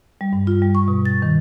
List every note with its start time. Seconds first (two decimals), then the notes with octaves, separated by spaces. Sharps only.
0.21 G3
0.33 G2
0.47 F4
0.62 G3
0.75 C#6
0.88 B2
1.05 A6
1.22 D#3